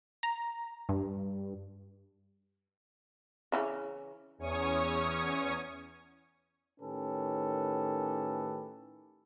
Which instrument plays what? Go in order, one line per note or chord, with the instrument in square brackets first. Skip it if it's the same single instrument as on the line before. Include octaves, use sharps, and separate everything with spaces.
[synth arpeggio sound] A#5
G2
[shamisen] C#3 E3 C#4
[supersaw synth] E2 C#4 C#5 C#6 D#6
[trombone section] A2 D#3 C#4 G4 A4 B4